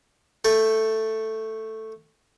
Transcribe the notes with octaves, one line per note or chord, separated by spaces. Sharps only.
A3 A4 G5